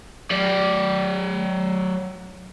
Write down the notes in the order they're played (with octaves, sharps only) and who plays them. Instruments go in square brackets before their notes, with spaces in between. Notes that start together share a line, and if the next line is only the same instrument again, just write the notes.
[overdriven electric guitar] F#3 D5